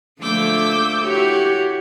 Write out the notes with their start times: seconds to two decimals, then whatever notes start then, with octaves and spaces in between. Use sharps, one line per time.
0.21 D3 F3 A3 D6 E6 G6
1.05 E4 F#4 G4 C#5